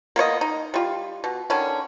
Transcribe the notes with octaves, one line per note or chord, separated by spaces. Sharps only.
A#3 B3 C#5 D#5
D#4
G3 F4
B2
D3 D#3 C#4